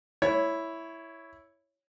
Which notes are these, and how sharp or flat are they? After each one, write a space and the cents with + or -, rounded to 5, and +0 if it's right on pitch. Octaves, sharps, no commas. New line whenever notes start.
E4 +0 C#5 +5